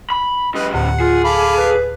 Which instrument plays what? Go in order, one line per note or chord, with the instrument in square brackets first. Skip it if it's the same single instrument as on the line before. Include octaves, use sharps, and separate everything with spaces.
[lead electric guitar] B5
[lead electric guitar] F2 G3 [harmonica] B4 D#5
[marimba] D2 A2 D3 [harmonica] F#5
[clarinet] F4 [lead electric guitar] G#4
[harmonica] A4 F5 D6 [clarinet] B5
[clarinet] B4